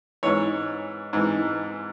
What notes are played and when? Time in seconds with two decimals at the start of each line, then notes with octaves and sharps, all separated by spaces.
0.23 G#2 E3 C#5
1.13 G#2 E3